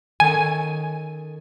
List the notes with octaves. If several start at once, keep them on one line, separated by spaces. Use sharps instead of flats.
D#3 C#4 A4 G#5